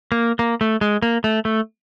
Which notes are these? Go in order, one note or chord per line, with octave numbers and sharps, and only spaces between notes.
A#3
A#3
A3
G#3
A#3
A3
A3